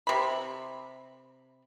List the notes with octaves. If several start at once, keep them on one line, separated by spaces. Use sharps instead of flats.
C3 B5